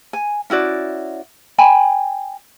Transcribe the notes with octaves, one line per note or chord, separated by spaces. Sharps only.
G#5
C#4 E4 F#4 D5
G5 G#5 B5